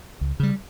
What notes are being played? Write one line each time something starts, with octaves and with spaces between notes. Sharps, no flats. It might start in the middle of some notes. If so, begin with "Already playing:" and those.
C#2
C#3 G3